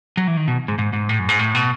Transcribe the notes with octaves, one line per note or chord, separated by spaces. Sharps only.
F#3
E3
D#3
B2
G#2
G#2
G#2
A2
F#2
G#2
A2
B2